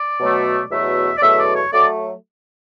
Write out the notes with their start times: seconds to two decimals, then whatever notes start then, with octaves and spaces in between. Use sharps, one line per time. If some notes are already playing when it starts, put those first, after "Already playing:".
Already playing: D5
0.20 B2 F#3 A3
0.71 E2 B2 F#3 A3 E5
1.17 D5
1.22 E2 B2 F#3 A3 E5
1.39 D5
1.56 C#5
1.72 F#3 A3 D5